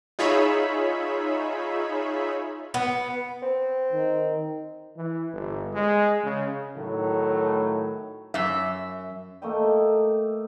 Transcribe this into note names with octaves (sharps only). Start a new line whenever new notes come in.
D#4 F4 G#4 C#5 E5 B5
B3
C4
D#3
E3
G1
G#3
C#3
A2 D#3 F#3 A3
F#2 E5
A3 A#3 D#5 G5